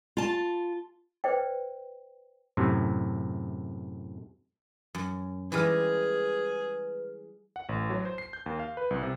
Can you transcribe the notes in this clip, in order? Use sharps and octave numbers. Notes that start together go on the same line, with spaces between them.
F4 A5
B4 C5 D5 G5
F#2 A2 C3
F#2
E3 G3 G#3 G#4 B4 F6
F#5
A1
F#3
C5
C7
G6
D#2
F5
B4
C2
C3